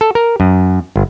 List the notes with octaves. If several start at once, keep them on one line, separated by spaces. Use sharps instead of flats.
A4
A#4
F#2
G1